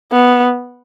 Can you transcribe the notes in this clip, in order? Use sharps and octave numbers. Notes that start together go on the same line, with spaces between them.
B3